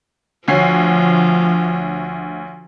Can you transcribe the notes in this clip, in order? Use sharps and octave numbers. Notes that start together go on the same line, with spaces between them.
D2 F3 C#5 C7